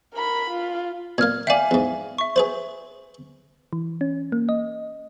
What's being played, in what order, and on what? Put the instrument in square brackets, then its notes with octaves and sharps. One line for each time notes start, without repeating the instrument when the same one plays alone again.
[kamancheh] A#4 B5
F4
[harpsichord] A#2 A#3 [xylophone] F6 G#6
[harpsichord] D5 G5 [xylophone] E5 F5 G#5
[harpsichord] E2 G#2
[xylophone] E5 C#6
[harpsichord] G#4 B4 C5
[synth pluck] E3
C#4
A#3
D#5